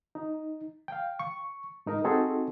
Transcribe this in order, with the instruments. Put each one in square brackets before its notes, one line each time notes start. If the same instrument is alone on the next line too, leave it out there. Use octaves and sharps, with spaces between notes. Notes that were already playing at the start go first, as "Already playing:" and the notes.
[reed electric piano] D#4
F5 G5
C#6
G#2 D#4 A#4
C4 D#4 F#4 G#4 A4 C5